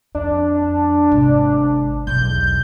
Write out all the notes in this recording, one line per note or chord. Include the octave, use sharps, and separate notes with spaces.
F2 D4
G#1 C3
B1 E2 G6